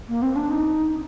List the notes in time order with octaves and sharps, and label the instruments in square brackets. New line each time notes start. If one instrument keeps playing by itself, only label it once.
[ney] A#3
C4
D4
D#4